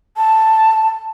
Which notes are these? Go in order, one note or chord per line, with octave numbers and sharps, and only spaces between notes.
A5